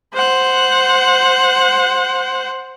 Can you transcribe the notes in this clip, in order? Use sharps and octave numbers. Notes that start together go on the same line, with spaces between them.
C5 F#5